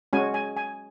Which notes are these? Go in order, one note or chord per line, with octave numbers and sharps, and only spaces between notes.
G#3 C#4 F#4 G#5
G#5
G#5